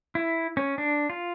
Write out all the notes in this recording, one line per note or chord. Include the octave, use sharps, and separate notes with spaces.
E4
C#4
D4
F4